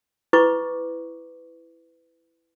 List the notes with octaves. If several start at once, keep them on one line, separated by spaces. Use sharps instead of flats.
E4 B4 C#6 D6